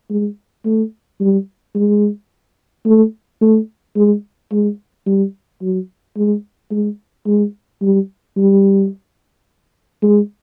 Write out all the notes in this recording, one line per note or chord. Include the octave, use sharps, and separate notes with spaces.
G#3
A3
G3
G#3
A3
A3
G#3
G#3
G3
F#3
G#3
G#3
G#3
G3
G3
G#3